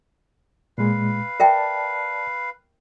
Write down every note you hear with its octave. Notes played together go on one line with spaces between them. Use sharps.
A#2 G#3 B4 F5
A#4 D5 E5 G5 A5